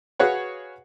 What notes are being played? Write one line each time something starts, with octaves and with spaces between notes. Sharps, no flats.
F#4 G#4 B4 C#5 F5 F#5